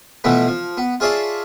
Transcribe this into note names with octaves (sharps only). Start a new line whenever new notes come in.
B2 E3 F3 A3 B3
F3
B3
F4 G#4 C#5 D5 E5 A5